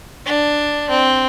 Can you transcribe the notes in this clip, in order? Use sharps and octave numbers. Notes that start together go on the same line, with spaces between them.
D4
C4